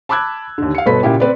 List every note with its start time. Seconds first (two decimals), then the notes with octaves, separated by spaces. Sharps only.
0.09 A5 B5 D6 E6 F#6 G#6
0.58 D#2 D3
0.75 F5 C#7
0.86 G1 B2 A4 B4 B5 B6
1.03 A#2 C#3 E4 G4
1.20 C4 B4 D5